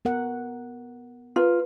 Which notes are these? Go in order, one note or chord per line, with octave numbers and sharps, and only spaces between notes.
B3 A#4 F#5
F4 A#4 B4 A#5